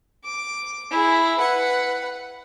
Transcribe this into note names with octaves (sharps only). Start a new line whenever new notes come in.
D6
E4 G#4
B4 F#5